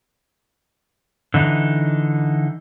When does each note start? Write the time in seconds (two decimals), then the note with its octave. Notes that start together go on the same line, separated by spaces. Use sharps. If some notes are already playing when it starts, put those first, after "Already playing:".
1.34 D3 E3 D#4